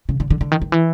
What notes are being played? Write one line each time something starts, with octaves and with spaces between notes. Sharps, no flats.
C#3
D3
D3
D3
D#3
D#3
E3